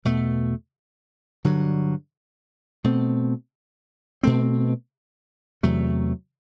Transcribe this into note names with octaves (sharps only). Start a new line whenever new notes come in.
E2 B2 A3
G2 D3 F#3
B2 A3 C4
B2 A3 C4
E2 C3 F#3 A3